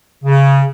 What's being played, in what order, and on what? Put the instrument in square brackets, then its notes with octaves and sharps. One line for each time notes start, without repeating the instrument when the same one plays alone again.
[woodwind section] C#3